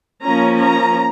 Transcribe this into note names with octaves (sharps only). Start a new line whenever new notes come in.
F3 A#3 C#4 A#5
A#5